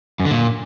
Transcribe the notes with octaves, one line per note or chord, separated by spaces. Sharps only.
F#2
D3
A#2